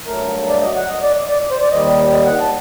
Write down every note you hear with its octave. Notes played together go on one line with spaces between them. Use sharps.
G2 F#3 A3 A#4
D5
D#5
F#5
D#5
D5
D5
C5
D5
D#2 D#3 G3 D#5
D#5
F#5
A5